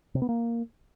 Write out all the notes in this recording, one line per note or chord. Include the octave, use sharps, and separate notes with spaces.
C3
B3
A#3